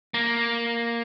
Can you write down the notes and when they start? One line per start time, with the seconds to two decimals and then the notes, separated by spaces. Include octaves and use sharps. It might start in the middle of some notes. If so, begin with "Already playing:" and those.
0.14 A#3